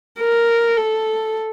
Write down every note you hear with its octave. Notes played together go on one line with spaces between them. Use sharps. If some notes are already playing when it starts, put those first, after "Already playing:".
A#4
A4